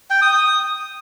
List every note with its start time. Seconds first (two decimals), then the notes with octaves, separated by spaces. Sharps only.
0.10 G5
0.22 D#6
0.34 D#6